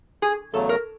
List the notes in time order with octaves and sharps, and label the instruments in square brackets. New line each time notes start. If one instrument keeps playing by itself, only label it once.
[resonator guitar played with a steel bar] G#4
[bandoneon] E2 C#3 F#3 A3 [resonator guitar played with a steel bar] A4
[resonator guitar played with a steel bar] A#4